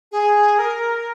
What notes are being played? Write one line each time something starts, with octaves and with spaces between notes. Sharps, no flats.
G#4
A#4